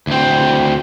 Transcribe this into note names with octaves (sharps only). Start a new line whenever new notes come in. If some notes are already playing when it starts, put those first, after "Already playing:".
D2 C4